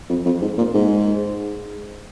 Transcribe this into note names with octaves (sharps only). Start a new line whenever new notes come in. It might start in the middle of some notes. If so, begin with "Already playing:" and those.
F2
F2
G#2
A#2
G#2